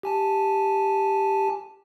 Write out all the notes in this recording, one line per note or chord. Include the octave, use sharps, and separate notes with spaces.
G4 G#5 A5